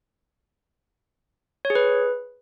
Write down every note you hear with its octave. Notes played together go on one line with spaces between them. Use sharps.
C#5
G#4
B4